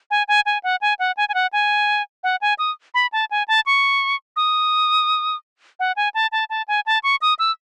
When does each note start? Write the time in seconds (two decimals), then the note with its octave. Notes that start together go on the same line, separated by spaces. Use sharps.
0.11 G#5
0.28 G#5
0.46 G#5
0.63 F#5
0.81 G#5
0.99 F#5
1.17 G#5
1.29 G#5
1.34 F#5
1.53 G#5
2.24 F#5
2.41 G#5
2.58 D#6
2.94 B5
3.12 A5
3.31 G#5
3.48 A5
3.66 C#6
4.36 D#6
5.80 F#5
5.96 G#5
6.14 A5
6.32 A5
6.50 A5
6.68 G#5
6.86 A5
7.03 C#6
7.22 D#6
7.39 E6